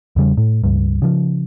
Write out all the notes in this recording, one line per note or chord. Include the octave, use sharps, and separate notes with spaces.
E2 C#3 G3
A2
C#2 G2
C#3 F3